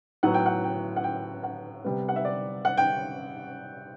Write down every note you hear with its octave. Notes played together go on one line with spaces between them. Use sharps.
A2 F#3 B3 F#5
G5
F#5
G5
F#5
G5
F#5
C3 G3 B3
F#5
E5
D5
F#5
G5